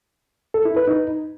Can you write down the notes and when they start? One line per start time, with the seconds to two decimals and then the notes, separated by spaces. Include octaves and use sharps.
0.54 A4
0.65 E4
0.76 B4
0.88 D#4